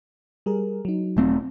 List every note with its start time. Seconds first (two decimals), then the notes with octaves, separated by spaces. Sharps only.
0.46 G3 G#4 A#4
0.85 F#3 D#4
1.17 E1 A3 C4